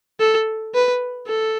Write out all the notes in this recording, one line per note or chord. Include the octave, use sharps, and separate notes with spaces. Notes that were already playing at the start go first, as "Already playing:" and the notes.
A4
B4
A4